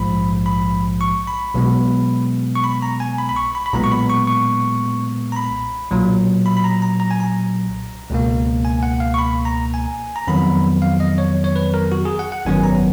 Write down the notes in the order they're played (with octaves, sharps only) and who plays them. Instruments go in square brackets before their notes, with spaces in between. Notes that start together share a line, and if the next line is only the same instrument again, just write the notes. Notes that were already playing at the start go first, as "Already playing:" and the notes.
Already playing: [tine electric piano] A#1 G#2 F3 G#3 B5
B5
C#6
B5
B1 B2 G#3 B3
C#6
B5
A#5
G#5
B5
B5
C#6
B5
B5
B1 A#2 G#3 B3 A#5
C#6
B5
C#6
C#6
A#5
B5
B1 A#2 F#3
B5
B5
A#5
A#5
A#5
G#5
A#5
C#2 B2 A#3
G#5
F#5
F5
C#6
B5
A#5
G#5
A#5
F2 D#3 F#3 B3 B5
F5
D#5
C#5
C#5
B4
A#4
F#4
G#4
F#5
F#5
G#1 F#2 D#3 F#3 B3 G#5
A#5